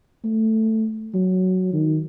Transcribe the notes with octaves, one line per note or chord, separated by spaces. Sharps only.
A3
F#3
D#3